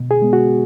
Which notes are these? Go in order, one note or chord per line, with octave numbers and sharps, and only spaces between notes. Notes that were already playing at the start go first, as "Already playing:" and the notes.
Already playing: B2
G#4
G#3 B3
F#4